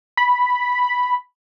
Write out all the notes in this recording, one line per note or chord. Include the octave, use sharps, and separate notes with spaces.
B5